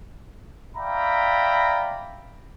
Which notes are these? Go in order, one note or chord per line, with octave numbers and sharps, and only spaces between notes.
D5 E5 F5 G5 A#5 B5